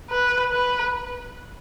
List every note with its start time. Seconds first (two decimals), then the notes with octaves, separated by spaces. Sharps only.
0.11 B4
0.52 B4